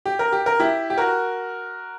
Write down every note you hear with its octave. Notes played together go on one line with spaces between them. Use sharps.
G4
A#4
G4
A#4
E4 G4
G4
F#4 A#4